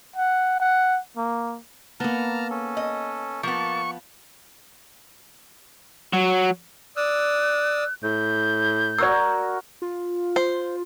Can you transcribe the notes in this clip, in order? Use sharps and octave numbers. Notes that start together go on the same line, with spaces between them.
F#5
F#5
A#3
A#3 B3 A5 A#5 F6
C#4 A4
D#5
F3 A#3 B3 A5 C#6
F#3
D5 D#6 E6 F#6
A2 G6
F#4 A#4 D5 E6
F4
C5